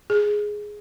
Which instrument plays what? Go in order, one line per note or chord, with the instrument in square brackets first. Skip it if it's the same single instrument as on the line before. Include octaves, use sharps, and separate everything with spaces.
[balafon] G#4